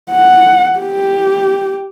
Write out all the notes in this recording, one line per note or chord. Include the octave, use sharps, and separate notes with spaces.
F#5
G4